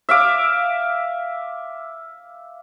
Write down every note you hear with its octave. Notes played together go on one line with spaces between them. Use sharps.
E5 F5 D6